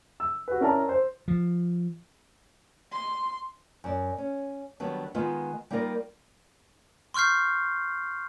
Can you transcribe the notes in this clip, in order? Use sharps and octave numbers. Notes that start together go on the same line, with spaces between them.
E6
F#4 B4
C#4 E4 A#4 D5 A5 A#5
C5
F3
C6
F#2 D5
C#4
D#3 F#3 G3 B3 D4
D#3 G#3 B3 F4
G3 A#3 D#4 F4 A#4 D5
C6 C#6 F6 G6 C7